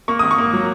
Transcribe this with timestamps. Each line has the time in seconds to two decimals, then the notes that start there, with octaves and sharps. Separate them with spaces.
0.08 A#3 C#6
0.19 G#1 D#6
0.31 C#6
0.38 A#3
0.53 F#3